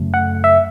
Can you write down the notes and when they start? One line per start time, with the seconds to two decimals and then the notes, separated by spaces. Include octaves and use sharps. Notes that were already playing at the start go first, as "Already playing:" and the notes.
Already playing: F#2 C#3 F#3 A3
0.14 F#5
0.44 E5